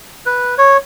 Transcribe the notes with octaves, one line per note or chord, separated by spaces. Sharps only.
B4
C#5